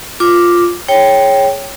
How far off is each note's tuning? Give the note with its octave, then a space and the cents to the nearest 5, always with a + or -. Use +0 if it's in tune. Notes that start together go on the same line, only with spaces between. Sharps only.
F4 +0 D6 +0
G#4 +0 C#5 -5 G5 +0